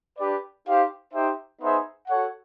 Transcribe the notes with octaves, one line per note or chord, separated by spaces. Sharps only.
D4 G4 B4 D5
D#4 G4 C5 F5
D#4 G4 C5 E5 G5
B3 D#4 G#4 C5 E5
F#4 A4 C#5 F#5